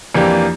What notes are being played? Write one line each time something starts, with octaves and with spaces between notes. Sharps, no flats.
F2 E3 A#3 D4 G4